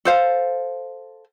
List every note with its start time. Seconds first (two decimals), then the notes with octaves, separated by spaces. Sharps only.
0.05 A4 C5 F5